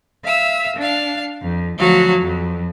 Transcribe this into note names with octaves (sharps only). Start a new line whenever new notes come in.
E5 F5 E6
D4 F5
F2
D2 F3 F#3 F#4 F5
F2